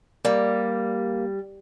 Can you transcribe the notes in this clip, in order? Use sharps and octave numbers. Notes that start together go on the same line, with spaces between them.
G3 A#3